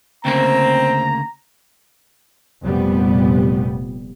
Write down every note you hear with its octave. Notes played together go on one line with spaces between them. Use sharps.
D2 C#3 A#3 C4 A#5
F1 A#2 G3 B3